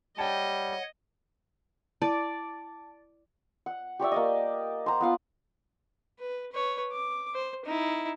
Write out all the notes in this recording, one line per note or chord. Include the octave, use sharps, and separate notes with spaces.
G3 C#5 D#5 F#5 G5 A5
E4 D5 A5
F#5
G4 C#5 D5 E5
A#3 D5 D#5
C5 F#5 A#5
B3 F4 F5 F#5
B4
B4 C#5
D6
C5
D#4 E4